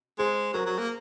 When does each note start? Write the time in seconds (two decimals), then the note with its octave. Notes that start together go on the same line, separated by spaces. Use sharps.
0.19 G#3 G#4 C5
0.54 F#3 A#4
0.66 F#3
0.78 A#3